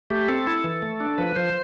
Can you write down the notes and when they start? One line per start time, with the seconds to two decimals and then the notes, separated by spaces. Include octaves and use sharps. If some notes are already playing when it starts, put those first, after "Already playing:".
0.10 A3 G4
0.28 C4 A4
0.47 E4
0.64 E3
0.82 A3
1.00 D4
1.18 F3 B4
1.36 F3 C5